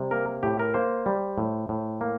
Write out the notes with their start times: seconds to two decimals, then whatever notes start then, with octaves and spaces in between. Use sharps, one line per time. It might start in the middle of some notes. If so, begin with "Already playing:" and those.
Already playing: C3 G3
0.11 A#3 A#4
0.43 A2 G4
0.59 A#4
0.74 A#3 C5
1.06 G3
1.38 A2
1.69 A2
2.01 A#3